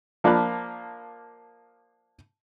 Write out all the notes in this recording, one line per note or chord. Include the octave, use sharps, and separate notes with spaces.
F3 A#3 D4 A5 B5 F#6